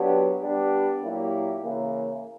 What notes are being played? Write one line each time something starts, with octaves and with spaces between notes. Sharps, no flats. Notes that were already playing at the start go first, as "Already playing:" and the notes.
Already playing: F#3 B3 D4 G4
G3 B3 D4 G4
A#2 F#3 A#3 E4 G4
C#3 E3 A#3